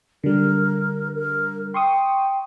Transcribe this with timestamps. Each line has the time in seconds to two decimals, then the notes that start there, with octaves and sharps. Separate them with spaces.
0.24 D3 G3 A#4
1.15 A#4
1.74 G5 C6 C#6 D#6